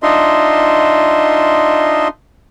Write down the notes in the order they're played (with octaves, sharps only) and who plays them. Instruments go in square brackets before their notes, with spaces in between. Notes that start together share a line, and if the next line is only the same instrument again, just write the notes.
[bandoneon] D4 D#4 F4 D#5 E5 C6